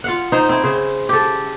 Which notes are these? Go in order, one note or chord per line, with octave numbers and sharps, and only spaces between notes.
F4 F5 F#5
D#4 C5
C4 E4
C#3 C5
G4 A4